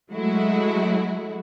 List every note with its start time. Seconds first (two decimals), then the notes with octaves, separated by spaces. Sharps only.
0.12 F#3 G#3 A3 E4 F#4